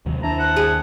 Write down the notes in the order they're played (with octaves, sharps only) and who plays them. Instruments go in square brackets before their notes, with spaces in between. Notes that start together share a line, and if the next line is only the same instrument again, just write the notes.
[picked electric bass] D#2 C3 F#3
[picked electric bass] D#2 D4 [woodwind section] E4 C5 A5 [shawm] A#5
[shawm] F#5
[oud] G#4